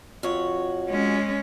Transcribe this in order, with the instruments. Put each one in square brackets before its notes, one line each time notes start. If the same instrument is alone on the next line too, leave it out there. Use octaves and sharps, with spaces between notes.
[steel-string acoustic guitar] F2 F#4 C#5
[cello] G#3 C#4